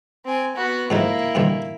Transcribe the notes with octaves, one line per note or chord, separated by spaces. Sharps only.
C4 G#5
B3 F#4
G#2 F3 A#3 D#4 E4
G2 A#2 D#3